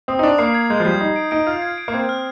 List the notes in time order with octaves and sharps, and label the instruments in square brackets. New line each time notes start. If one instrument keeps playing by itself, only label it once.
[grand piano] C4 [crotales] D#6
[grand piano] D#4
[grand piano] D4 [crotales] D#6
[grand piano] A#3 [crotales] C7
[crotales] G#6
[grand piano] G#3 [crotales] G6
[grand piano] F3
[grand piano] G3 [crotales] G6
[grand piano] D#4 [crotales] G6
[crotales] D7
[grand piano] D#4 [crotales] D7
[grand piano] F4 [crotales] G6
[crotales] G#6
D7
[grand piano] A#3
[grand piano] C4 [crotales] G#6
[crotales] F6